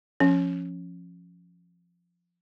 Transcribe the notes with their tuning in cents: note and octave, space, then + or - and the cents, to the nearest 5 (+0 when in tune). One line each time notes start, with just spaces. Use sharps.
F3 +0 C#4 -5